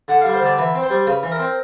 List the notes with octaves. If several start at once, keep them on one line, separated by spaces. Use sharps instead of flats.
D3 F#5
G3 F5
C5
D3 D5
E3 B4
C4
C5
G3
C#3 B4
E3
A#4
C4